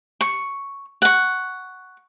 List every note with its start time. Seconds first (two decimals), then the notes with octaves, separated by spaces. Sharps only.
0.21 C#6
1.02 F#5 C#6